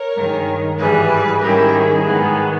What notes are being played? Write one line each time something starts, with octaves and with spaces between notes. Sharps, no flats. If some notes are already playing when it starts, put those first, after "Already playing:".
Already playing: A#4 C#5
G2 D#3 G#3
G#2 E3 G3 G#4 B4
G#2 D#3 G3 C#4 E4 G4 A#4
G#4
G#2 D#3 G#3 B3